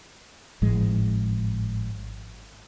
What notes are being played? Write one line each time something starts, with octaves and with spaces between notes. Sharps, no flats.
G#1 A2 F3 G#3